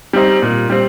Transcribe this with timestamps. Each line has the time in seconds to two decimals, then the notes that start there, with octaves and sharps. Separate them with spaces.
0.13 G3 C4 D#4
0.42 A#2
0.70 G3 C4